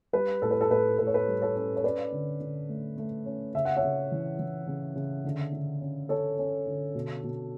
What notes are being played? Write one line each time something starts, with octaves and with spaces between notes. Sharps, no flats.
G3 B4
A2 A4
B4
A4
A2 B4
A2 B4
C#5
B4
G3
A4 C#5
C#4
C#5
C#4 B4 D5
D3
D3
A3
A3
C#4
C#3 E5
F#5
C#5 E5
C#3
E3
E3
C#3
C#3
D3
D3
C#4
C#4 A4 C#5
C#4
D3
B2
B2